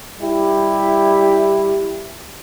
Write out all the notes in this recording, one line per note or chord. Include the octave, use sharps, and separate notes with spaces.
G3 E4 G4